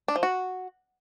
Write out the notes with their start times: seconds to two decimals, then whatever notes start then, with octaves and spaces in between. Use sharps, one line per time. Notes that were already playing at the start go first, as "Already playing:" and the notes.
0.08 D4
0.16 F3
0.23 F#4